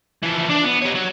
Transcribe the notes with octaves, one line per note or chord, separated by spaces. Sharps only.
E3 F3
D4
B3
G4 C#5
F#3